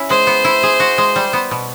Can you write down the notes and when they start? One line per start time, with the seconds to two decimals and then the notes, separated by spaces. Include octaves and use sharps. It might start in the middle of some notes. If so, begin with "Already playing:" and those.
Already playing: C#4 E4
0.10 G#3 C5
0.27 B3
0.45 E4
0.63 G#4
0.80 F#4
0.98 G#3
1.16 G3
1.33 B3
1.51 B2